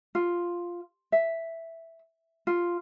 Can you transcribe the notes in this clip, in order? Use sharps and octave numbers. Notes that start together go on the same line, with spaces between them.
F4
E5
F4